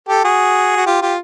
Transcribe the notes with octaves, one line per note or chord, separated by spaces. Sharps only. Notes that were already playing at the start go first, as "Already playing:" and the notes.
G4 A4
F#4 G#4
F#4
F4 G4
F4 G4